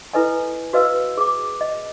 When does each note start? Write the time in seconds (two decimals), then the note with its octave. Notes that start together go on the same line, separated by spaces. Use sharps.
0.13 E4 A4 B4 D#5 G#5
0.73 F#4 B4 D#5 F5 E6
1.17 G#4 D6
1.61 D#5